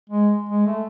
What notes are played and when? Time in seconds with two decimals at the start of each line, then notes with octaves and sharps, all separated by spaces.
0.09 G#3
0.49 G#3
0.66 A3